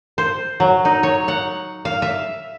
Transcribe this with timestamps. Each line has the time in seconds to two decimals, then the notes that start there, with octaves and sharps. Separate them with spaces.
0.18 C5
0.60 F#3
0.85 D#4
1.03 C#5
1.28 F#5
1.85 F5
2.02 E5